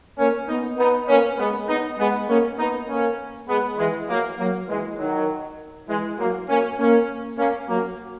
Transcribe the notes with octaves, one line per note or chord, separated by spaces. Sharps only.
A#3 C#4
B3 D#4
B3 D#4
A#3 C#4
G#3 B3
B3 D#4
G#3 B3
A#3 C#4
B3 D#4
A#3 C#4
G#3 B3
E3 G#3
F#3 A#3
F#3 A#3
E3 G#3
D#3 F#3
E3 G#3
F#3 A#3
A#3 C#4
A#3 C#4
A#3 C#4
F#3 A#3